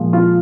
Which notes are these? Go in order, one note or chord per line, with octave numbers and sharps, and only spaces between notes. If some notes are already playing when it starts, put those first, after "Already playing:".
Already playing: A#2 F3 G#3
F4